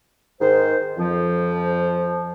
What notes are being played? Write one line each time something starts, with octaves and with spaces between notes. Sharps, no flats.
G#2 D#3 C5
F2 F3